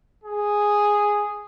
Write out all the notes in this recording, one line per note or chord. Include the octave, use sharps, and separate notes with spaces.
G#4